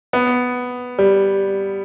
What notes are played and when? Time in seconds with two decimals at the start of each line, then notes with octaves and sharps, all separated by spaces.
0.13 B3
0.99 G3